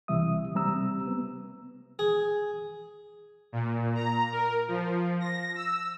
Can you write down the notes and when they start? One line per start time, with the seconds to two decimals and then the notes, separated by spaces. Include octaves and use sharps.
0.08 C2 C3 E3 G3 E5 D#6
0.55 C3 G3 C4 A#5 E6
1.07 B3
1.99 G#4
3.52 A#2
3.95 A#5
4.33 A#4
4.68 F3
5.20 A#6
5.56 E6